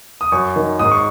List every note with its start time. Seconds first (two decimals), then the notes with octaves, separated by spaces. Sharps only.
0.21 D#6
0.32 F#2 C#6
0.56 D#3
0.79 G#2 D#6
0.91 C#6